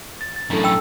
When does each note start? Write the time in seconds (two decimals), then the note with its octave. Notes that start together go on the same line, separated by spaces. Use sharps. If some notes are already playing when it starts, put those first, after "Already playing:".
0.21 A6
0.36 A6
0.50 F#2 A2 D4 A4
0.64 G5 E6